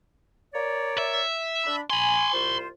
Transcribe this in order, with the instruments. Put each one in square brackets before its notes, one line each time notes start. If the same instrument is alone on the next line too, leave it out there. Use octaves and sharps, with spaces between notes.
[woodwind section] A#4 C#5 D5
[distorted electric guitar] E5
[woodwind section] D4 B5
[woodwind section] G#5 [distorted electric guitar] B5 C6
[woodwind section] C2 F4 C5